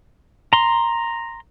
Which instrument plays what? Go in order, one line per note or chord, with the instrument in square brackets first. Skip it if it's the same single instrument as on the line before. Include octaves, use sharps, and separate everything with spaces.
[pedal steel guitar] A#5 C6